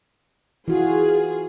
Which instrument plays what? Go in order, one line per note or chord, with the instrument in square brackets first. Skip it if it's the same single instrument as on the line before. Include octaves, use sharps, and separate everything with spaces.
[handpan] E3 F#4 [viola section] F4 G#4